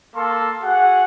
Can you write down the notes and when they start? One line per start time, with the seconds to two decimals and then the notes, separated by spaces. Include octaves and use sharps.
0.15 A#3 A4 A5 C6
0.63 F#4 G#4 F#5